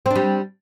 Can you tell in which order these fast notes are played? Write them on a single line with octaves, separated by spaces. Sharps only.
C4 D4 G3